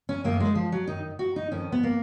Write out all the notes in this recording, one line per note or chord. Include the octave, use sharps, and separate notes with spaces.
C#4
F#2 D#3 A#3
G#3
F3
F#3
F#2 D#3 D#4
F#4
D#4
F2 D#3 C#4
B3
A#3